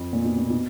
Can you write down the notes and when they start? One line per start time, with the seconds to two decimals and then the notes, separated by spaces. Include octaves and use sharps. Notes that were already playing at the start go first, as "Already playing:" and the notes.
Already playing: F2
0.13 A#2
0.25 B2
0.38 A#2
0.50 B2